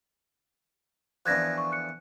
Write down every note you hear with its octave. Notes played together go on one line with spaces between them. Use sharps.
E2 D3 F3 F#6 G#6 A#6
C#6
F#6 C#7